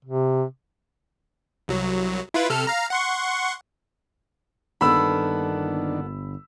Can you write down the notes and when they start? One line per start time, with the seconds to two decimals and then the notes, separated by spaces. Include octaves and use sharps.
0.05 C3
1.68 C2 F#3
2.34 E4 F4 B4
2.50 C3 A4 F6
2.67 F5 A#5
2.90 F#5 C6 C#6
4.81 G1 D#3 A#3 B3 D4 A4 B5 E6